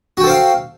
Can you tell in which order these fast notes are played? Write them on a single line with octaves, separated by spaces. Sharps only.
F#4 G5 A4 C5 F5